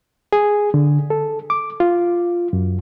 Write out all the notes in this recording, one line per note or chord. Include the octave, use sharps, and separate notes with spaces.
G#4
D3
A4
D6
F4
F#2